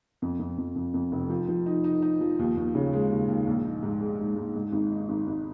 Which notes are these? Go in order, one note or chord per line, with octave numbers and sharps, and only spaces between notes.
F2
F2
F2
F2
F2
F1
F3
F3
D#4
D#4
D#4
F3
D#2
D#2
C#3
G#3
D#2
D#2
A#1
D#4
G#2
G#3
G#2
G#2
G#2
G#1
D#4
G#1
G#1